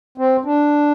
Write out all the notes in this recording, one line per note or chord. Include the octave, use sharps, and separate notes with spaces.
C4
D4